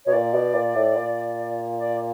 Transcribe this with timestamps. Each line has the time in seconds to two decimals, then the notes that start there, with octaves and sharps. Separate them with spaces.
0.05 B2 C#5
0.13 A#2 D5
0.34 B2
0.55 A#2
0.75 A2
0.95 A#2
1.78 D5